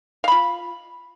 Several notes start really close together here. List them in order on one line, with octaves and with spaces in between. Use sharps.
F5 B5 F4